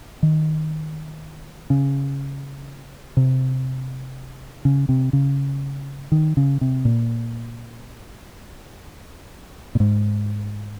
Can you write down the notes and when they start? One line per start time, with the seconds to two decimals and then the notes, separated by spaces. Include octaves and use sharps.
0.23 D#3
1.70 C#3
3.17 C3
4.65 C#3
4.89 C3
5.13 C#3
6.12 D#3
6.37 C#3
6.61 C3
6.85 A#2
9.75 A#2
9.80 G#2